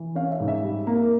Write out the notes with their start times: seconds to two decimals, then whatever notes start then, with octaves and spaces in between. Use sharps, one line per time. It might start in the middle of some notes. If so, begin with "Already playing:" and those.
Already playing: E3
0.15 C#4 F5
0.31 E5
0.40 G#2
0.48 E5
0.63 G3
0.87 A#3
1.02 A#4